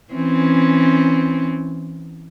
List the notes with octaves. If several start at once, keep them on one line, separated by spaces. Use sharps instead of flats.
E3 C4 C#4